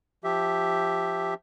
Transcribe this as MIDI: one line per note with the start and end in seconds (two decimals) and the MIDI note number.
0.24 1.34 53
0.24 1.34 67
0.24 1.34 76